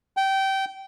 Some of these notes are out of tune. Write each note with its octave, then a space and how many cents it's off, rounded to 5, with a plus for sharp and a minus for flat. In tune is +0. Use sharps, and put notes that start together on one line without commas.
G5 -20